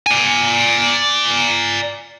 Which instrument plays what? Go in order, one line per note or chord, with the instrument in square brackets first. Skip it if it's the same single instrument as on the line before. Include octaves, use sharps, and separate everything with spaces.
[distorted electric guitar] D5 G#5